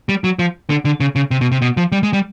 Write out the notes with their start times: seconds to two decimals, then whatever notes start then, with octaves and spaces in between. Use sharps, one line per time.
0.09 G3
0.24 F#3
0.39 F3
0.70 D3
0.85 D3
1.00 C#3
1.16 C#3
1.31 C3
1.41 B2
1.52 C3
1.62 B2
1.77 F3
1.92 G3
2.03 G#3
2.13 G3